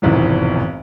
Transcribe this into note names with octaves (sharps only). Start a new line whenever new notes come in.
F1 B1 E2 G#2 D#3 E3